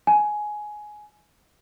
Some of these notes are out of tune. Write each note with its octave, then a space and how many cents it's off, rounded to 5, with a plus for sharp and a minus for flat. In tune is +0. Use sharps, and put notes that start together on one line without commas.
G#5 +15